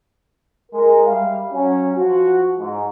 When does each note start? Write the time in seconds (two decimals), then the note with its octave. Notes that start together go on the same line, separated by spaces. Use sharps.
0.72 G#3 A#4
1.07 G3 E5 F5
1.52 F#3 C#4
1.96 F3 F#4
2.59 G#2